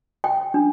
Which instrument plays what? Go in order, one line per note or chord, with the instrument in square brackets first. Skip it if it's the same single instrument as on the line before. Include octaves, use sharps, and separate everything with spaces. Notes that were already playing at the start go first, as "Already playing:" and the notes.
[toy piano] G5
D4